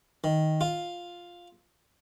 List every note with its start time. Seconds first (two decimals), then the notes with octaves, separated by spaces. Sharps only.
0.24 D#3
0.61 F4